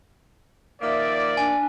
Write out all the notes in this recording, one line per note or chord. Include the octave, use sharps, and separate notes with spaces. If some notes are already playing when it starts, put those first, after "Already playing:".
D#3 F3 A#3 D5 E5
D4 G#5